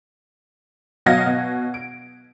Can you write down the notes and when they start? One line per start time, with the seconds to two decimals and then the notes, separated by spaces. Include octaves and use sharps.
1.06 B2 F#3 D#5 F5 G#6 A#6
1.26 B2
1.74 D7